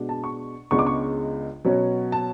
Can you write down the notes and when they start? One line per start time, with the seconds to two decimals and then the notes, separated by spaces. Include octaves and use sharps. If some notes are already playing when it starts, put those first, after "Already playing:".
Already playing: B2 G#3 D4
0.09 A5
0.24 C#6
0.71 C#2 C#3 G#3 B3 D4 C#6
0.79 D6
0.87 C#6
1.65 B2 F#3 C#4
2.12 A5